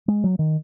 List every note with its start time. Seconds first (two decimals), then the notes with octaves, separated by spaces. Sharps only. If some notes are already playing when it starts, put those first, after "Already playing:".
0.08 G#3
0.24 F#3
0.39 D#3